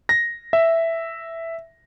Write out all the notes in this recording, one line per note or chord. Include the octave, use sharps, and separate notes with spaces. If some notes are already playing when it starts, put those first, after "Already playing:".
A#6
E5